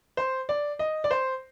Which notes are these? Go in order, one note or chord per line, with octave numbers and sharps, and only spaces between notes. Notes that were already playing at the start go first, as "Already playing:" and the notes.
C5
D5
D#5
D5
C5